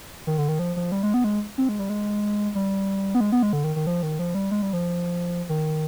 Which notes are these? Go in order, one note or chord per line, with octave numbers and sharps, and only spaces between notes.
D#3
D3
D#3
F3
F3
G3
G#3
B3
G#3
C4
G#3
G3
G#3
G3
B3
G#3
B3
G#3
D3
D#3
D#3
F3
D#3
F3
G3
G#3
G3
F3
D#3